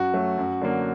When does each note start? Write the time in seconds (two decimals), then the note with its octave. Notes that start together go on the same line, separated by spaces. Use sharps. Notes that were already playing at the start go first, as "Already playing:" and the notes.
Already playing: F#2 F#4
0.14 F#3 A3
0.38 F#2
0.61 D3 F#3 A#3